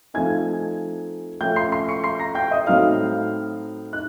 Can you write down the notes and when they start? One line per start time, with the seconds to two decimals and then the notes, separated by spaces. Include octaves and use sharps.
0.14 F3 A3 C4 D#4 G#5 G#6
1.41 F3 A3 C#4 G5 G6
1.56 C6 C7
1.72 C6 C7
1.88 C#6 C#7
2.04 C6 C7
2.20 A#5 A#6
2.35 G5 G6
2.51 D#5 D#6
2.67 A2 F#3 A3 C4 D#4 F5 F6
3.93 D#4 F#6